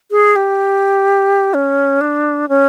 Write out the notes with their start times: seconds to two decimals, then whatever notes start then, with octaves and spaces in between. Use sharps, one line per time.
0.11 G#4
0.36 G4
1.54 C#4
2.01 D4
2.49 C#4